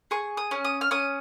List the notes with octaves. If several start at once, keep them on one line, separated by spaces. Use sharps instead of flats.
G#4 C#6
D#6
C#4
D#6
F6
C#4 D#6